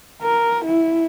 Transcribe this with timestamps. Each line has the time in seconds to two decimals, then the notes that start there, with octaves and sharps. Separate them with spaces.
0.22 A#4
0.65 E4